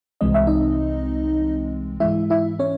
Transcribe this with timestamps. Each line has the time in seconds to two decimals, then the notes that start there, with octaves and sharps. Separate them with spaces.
0.21 C2 C3 E3 G#3 C4 D#5
0.34 E5
0.47 D#4 D#5
2.00 G#2 E3 G#3 E4 E5
2.30 E4 E5
2.59 C#4 C#5